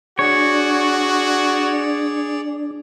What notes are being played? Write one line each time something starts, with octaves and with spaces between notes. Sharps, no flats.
D4 F#4 G#4 C#5 D5